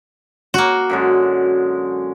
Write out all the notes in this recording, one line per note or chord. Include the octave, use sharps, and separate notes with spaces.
A#3 F#4
F#2 D3 G#3